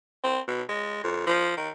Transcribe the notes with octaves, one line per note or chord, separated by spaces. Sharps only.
C4
B2
G#3
F2
F3
D#3